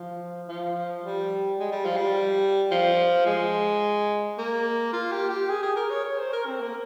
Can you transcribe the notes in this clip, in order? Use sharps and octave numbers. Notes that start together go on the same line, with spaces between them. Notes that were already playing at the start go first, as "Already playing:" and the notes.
Already playing: F3
F3
G3
G#3
G3
F3
G3
F3
G#3
A#3
F4
G4
G4
G#4
G#4
A#4
C#5
C#5
C5
A#4
C4
A#3